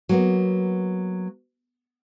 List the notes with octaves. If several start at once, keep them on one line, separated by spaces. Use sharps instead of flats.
F#3 A#3 B3